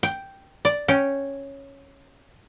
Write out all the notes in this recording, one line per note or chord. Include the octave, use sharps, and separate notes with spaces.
G5
D5
C#4 G5